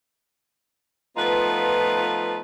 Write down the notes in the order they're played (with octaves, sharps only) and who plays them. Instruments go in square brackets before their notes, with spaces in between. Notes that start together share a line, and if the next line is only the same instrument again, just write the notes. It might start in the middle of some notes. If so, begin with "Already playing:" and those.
[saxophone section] F3 A3 B3 D#4 F4 B4